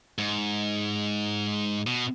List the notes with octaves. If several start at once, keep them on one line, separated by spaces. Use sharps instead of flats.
G#2
B2